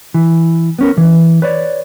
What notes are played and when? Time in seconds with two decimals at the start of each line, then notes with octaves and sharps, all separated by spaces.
0.14 E3
0.79 B3 C#4 A#4
0.98 E3
1.42 B4 C#5 D5